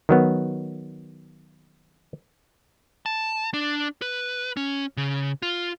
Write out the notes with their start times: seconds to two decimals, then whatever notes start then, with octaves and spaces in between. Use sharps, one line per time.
0.09 D#3 F#3 B3
3.06 A5
3.54 D4
4.02 B4
4.57 C#4
4.97 C#3
5.42 F4